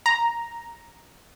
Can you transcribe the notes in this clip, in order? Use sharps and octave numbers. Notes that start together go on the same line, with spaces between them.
A#5